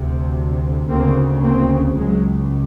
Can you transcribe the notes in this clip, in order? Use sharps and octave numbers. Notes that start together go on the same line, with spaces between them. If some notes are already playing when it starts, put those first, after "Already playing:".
Already playing: D2 C3
D2 C#3 A#3 C4
A#3 C4
C#2 C#3 F#3 G#3